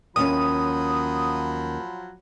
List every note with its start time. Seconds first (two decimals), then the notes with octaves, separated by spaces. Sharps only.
0.16 D#2 F3 F#3 C#4 B5 D#6